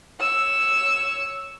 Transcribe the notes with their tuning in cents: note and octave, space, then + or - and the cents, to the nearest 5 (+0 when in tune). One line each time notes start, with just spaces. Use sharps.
C#5 +5 E6 +0